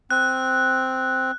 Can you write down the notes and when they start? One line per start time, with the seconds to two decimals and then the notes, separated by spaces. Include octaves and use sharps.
0.11 C4 F#6